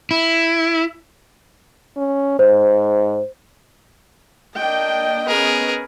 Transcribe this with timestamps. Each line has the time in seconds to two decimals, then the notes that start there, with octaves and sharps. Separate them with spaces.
0.11 E4
1.97 C#4
2.39 G#2 C5
4.57 A#3 D4 D#5 G5
5.28 B3 C#4 G#4 A#4 B4